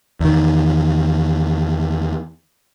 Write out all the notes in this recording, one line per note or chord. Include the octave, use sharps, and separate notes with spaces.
E2 D#3